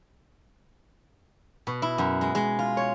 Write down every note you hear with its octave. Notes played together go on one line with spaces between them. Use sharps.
B2
E4
F#2
G#3
G#3
F4
C#5